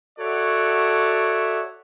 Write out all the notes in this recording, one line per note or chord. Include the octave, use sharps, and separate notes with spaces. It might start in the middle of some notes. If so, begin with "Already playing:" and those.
F#4 A4 C#5 D5 E5 F#5